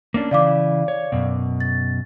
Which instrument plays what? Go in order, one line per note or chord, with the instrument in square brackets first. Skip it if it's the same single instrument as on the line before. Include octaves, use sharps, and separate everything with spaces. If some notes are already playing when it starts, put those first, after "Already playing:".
[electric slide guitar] A#3 C#4 D4
[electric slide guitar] C#3 E3 [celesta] D5 F5 D6
[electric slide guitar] C#5
F#2 B2
[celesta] A6